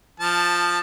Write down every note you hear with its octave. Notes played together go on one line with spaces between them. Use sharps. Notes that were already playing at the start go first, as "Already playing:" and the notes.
F3 A5